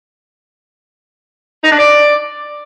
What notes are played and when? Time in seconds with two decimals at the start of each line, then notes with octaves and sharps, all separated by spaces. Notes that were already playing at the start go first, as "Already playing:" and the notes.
1.64 D#4
1.72 D4
1.79 D5